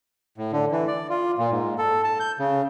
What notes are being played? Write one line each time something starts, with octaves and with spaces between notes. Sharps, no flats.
A2
D3
E3
D5
F4
A#2
G#2
A4
A5
G6
C#3